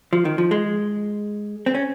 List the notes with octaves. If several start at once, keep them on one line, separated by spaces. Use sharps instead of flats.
F3
D#3
F3
G#3
C4
C#4